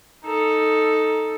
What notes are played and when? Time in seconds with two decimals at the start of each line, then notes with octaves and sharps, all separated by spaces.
0.25 D#4 A4